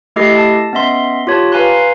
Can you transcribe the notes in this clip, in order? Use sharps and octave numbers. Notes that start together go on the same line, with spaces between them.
A3 E4 G4 A4 D#5 C7
A5
B3 C#4 D#5 E5 C6
F4 G4 C#5 A5
B4 F5 G#5 A#5 C6 F#6